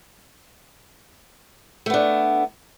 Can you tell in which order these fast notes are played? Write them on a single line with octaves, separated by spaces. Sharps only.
A3 B3 D4